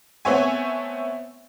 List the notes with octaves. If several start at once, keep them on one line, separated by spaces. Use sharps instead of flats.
A3 B3 C4 C#5 E5 G#5